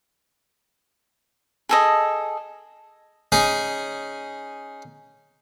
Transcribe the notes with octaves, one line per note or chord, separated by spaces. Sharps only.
G#4 A4 D#5
C#4 D#4 G#4